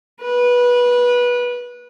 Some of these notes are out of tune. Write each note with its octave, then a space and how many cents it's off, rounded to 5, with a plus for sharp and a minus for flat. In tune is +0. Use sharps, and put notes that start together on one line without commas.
B4 -20